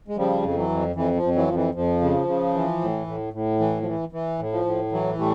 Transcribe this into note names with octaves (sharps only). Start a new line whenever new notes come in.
G#3
C#3 F3 G3
F2
E3 F#3
F2
F2 E3
F3
F2
E3 F#3
F2 F3
E3
F2 F3
C#3
C#3
E3
A2
A2
A2
E3
F3
E3
E3
A2
F3
A2
E3 F#3
A2 G3 A3